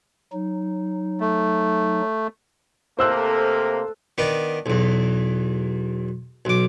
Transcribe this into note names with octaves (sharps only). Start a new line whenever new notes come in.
F#3 D#4
A3
C3 A3 A#3 A4 C5 E6 F#6
D#3 B3 D4
B1 E2
B1 D6